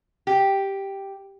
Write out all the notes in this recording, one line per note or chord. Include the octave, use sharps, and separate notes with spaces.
G4